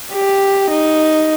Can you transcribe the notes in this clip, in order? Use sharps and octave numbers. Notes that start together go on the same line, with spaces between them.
G4
D#4